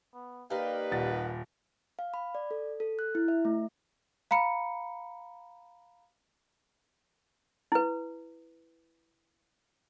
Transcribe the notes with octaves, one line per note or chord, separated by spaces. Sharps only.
B3
A#3 D#4 G4 B4 D5 F5
D#1 F#5 A6
F5
B5
D5
A4
A4
F#6
E4
E5
A3
F5 A#5 B5 C#7
E4 B4